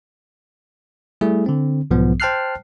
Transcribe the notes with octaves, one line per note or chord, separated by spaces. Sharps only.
G3 A3 E4 G#4
D3 C4
B1 G#2 F3 B3
C5 G5 A5 F6 F#6 C7